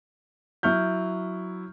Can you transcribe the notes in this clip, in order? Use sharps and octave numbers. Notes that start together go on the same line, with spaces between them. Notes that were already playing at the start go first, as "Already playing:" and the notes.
F#3 E4 C#6 F6 G6